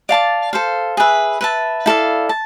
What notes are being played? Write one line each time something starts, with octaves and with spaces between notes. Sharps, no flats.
D5 F5 A5 D6
A4 C5 F5
G#4 B4 E5
B4 E5 A5
E4 A4 D5 F5
A5